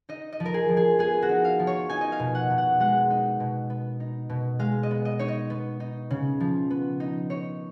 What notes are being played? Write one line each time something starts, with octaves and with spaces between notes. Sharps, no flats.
D#4 D#5
D#5
F3
A#4
G#4
F3
G#4
B3 G#4
F#4
D#4
F5
F3
C#5
D#4 G#5
D#5
F5
B2
F#5
B2
F#5
G#3 F#5
D#4
B2
B3
D#4
B2
G#3 F5
D#5
B3
D#5
D#4 C#5
D#5
B3
D#4
C#3
F3
B3
D#4
D#4 C#5